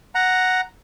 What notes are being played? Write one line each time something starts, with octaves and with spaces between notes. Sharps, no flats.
F#5 A#5